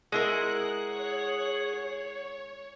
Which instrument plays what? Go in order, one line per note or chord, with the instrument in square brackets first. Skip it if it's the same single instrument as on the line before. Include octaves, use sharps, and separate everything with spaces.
[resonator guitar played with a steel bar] G#3 E4 A#4 [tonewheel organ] G#4 F#5 [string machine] F#6
[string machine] C#5